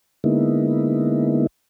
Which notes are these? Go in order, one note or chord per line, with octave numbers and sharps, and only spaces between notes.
D3 G#3 A#3 B3 D#4 E4